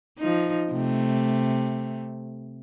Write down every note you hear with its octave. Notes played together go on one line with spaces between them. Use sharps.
F3 D#4
C3 A3